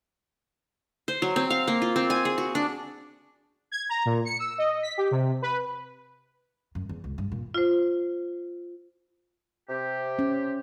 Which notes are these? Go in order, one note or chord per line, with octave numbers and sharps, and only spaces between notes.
C5
F#3
C4
F5
A#3
F4
C4
G#5
G#4
F#4
D4
G#6
A#5
A#2
C#7
E6
D#5
B6
G4
C3
B4
F#2
E2
C#2
G2
A#2
F4 C5
C3 G4
C#4